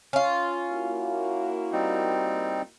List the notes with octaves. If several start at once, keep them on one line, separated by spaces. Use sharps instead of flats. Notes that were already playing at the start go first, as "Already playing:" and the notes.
C#4 F4
A#3 E4 F#4
G3 C4 D#4